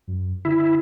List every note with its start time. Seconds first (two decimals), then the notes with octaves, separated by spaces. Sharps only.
0.08 F#2
0.45 D3 E4